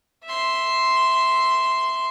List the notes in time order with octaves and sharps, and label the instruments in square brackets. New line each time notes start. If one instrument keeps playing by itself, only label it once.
[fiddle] E5 C6